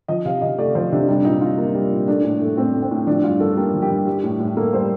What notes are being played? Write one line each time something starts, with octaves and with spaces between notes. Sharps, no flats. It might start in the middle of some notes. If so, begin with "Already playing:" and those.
F3 D#5
C3 F5
C3 D#5
A3 D5
F3 C5
C3 D4
G3 D4
A#2 D#4
A#2 F4
A#3
G3
A#2
A3 D4
A2
A3
A2 C4
A3
C4
A2
F3 D4
G2 F4
G2 A4
A#3 G4
F3
G4
G2
G3 G4
A2
A2
A#3 A4
G3 C5